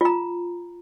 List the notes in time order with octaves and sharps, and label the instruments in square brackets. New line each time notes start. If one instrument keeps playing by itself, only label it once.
[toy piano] F4 A#5